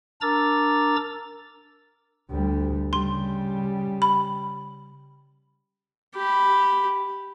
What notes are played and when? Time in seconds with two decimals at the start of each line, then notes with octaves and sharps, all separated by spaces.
0.21 D4 A#4 A#5 D6 E6 A6
2.31 D2 G3
2.93 C#3 G3 C6
4.02 B5
6.15 G4 B5